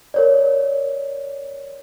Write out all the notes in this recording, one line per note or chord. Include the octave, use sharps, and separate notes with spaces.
A#4 C#5 D5